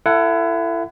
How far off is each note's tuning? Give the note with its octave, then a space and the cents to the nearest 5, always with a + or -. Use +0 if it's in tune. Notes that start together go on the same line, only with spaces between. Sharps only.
E4 +30 A4 +25 F#5 +0